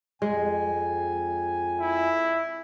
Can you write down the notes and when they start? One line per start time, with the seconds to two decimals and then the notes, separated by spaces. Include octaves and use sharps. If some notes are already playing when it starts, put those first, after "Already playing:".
0.22 F2 G#3 G#5
1.80 E4